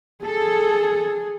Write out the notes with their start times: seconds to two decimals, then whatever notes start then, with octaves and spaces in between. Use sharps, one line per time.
0.24 G#4 A4